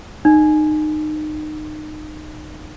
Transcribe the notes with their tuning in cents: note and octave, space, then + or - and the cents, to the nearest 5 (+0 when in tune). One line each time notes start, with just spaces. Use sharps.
D#4 -25